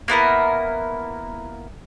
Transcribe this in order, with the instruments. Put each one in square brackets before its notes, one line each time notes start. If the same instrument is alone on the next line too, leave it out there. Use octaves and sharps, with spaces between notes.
[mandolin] A#3 B3 E4 A#4